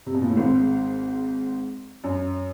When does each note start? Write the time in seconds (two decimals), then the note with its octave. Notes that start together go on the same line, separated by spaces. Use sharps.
0.06 C3
0.14 B2
0.22 A#2
0.30 A2
0.37 G#1 G#2
2.04 F#2